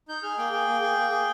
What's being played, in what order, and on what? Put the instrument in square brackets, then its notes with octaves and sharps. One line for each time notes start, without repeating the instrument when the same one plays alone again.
[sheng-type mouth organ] D#4 G6
G#4 F6
A#3 G5
G#4
A#3
G#4
A#3
G#4